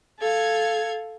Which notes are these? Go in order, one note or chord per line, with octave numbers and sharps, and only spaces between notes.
A4 F5 G#6